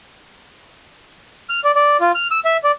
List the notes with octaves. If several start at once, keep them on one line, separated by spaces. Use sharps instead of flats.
F6
D5
D5
F4
F6
E6
E5
D5